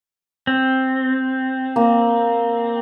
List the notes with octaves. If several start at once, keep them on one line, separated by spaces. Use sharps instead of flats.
C4
A#3